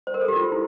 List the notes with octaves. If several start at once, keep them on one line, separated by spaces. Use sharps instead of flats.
C5
A#4
A4
G4
F4
E4